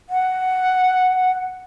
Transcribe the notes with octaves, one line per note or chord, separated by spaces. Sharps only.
F#5